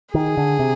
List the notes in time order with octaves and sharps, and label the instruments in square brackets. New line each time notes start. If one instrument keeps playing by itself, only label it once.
[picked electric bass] D#3 [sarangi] G#4
[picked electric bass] D3
C3